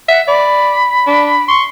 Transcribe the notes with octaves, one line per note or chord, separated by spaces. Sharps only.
E5 F#5
D5 B5
D4
C6 C#6